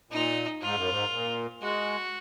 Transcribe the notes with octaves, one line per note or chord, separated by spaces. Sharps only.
A#2 D#4
G#2 F4
F#2
G#2
A#2
G#3 F#4